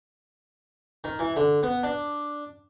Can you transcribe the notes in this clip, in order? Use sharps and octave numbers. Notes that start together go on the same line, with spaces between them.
D#3
E3
D3
B3
D4